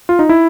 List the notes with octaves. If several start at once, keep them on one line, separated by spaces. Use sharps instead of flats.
F4
D#4
E4